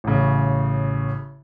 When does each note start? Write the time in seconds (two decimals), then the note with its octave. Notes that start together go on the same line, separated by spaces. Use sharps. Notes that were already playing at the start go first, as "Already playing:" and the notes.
0.04 A1 C#3